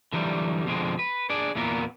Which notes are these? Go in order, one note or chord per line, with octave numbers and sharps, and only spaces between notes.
D3 E3 F#3 G3
F2 B2 D3 F3 G#3 C4
B4
D4 G#4 D5
E2 A#2 E3 A#3 B3 A#4